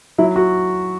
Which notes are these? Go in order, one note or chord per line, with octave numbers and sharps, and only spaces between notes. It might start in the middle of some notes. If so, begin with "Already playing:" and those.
F#3 E4
F#4